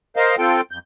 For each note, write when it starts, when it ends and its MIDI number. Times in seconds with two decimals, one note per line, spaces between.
0.16 0.36 70
0.16 0.36 72
0.16 0.36 75
0.16 0.36 77
0.38 0.61 60
0.38 0.61 65
0.38 0.61 69
0.38 0.61 79
0.71 0.79 41
0.71 0.79 91